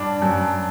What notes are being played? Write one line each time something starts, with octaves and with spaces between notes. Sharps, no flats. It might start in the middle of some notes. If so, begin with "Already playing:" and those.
Already playing: G2 D4
F#2